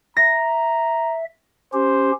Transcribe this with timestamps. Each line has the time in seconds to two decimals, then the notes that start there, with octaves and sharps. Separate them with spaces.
0.17 E5 A#5 A#6
1.73 C#4 G4 C5